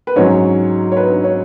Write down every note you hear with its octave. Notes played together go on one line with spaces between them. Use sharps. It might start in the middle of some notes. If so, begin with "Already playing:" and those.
B4
G#2 F#3 C#4 C#5
C#5
B4
C#5